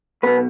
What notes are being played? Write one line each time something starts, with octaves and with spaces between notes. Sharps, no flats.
B1 B2 B3 B4